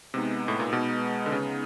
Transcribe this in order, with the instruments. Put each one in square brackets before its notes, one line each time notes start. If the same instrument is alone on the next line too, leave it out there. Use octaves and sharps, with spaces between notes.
[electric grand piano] C3 [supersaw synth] G#3 B3 D#4
[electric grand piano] A2
A#2
B2
D3
C#3